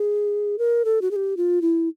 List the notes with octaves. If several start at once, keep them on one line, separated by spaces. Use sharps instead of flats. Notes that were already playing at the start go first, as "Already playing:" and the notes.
Already playing: G#4
A#4
A4
F#4
G#4
G4
F4
E4